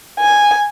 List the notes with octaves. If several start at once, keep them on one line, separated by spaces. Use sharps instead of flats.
G#5